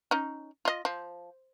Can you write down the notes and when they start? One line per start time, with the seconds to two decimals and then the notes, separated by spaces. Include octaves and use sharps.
0.11 C#4 D#4
0.65 F4 D#5
0.85 F3